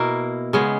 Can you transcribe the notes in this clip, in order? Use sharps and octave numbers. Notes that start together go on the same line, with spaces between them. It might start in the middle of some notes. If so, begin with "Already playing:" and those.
Already playing: B2 A#3 E4 A#4
C#3 G#3 B3